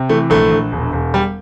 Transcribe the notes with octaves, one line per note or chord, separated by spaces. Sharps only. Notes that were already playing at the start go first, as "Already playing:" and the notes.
Already playing: C3
E3 A3
A#1 A3
A#1
E1
E1
G3